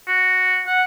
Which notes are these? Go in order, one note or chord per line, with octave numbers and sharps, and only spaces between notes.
F#4
F#5